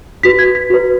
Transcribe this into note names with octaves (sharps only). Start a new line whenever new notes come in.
F#4 B4 B6
G#6
B6
F#4 B4